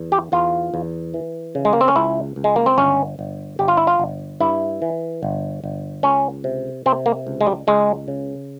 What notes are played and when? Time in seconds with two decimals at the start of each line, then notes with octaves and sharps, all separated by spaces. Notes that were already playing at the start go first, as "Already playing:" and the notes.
Already playing: E2
0.12 G4
0.32 E2 F4
0.74 E2
1.14 E3
1.55 C#3
1.65 G#3
1.73 A#3
1.81 C4
1.88 C#4
1.96 C#2 E4
2.36 C#2
2.44 G#3
2.56 A#3
2.66 C4
2.78 G1 C#4
3.19 G1
3.59 G1 G4
3.68 F4
3.77 E4
3.87 F4
3.99 G1
4.40 G2 E4
4.82 E3
5.23 G1
5.64 G1
6.03 C#2 C#4
6.44 C3
6.86 C3 C4
7.06 A#3
7.27 C#2
7.41 G#3
7.47 G3
7.67 C#2 G#3
8.08 C#3